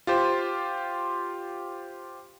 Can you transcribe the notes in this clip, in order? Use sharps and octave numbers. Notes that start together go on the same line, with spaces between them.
F4 G4 C5